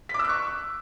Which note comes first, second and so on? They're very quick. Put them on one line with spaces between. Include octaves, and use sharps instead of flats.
B6 D6 E6 F#6 C#6